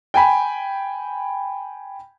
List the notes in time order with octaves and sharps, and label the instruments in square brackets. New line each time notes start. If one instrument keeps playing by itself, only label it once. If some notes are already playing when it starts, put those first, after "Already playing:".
[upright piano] G5 G#5 B5